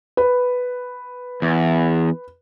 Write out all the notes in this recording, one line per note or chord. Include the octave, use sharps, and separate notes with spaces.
B4
E2